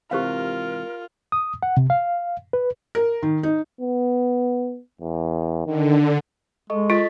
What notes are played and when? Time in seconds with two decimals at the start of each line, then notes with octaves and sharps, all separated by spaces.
0.11 G#2 C3 E3 F4 G4 A#4 C5 F5
1.32 D#6
1.63 F#5
1.77 C3
1.90 F5
2.53 B4
2.95 A#4
3.22 D#3
3.43 D#4
3.81 B3
5.01 E2
5.66 D3 D#3
6.70 G#3 A4 D#5 C#6
6.90 F4 D#5 A6 B6